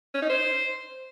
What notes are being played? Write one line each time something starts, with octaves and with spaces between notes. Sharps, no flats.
C#4
D#4
C5